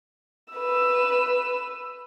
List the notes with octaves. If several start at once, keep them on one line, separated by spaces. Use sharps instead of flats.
B4 E6